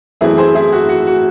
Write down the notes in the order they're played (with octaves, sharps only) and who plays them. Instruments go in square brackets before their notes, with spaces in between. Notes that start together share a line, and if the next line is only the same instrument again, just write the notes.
[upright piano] F#2 E3 A3 C4 E4 G#4
G#4 C5
E4 G#4
F#4
F#4
F#4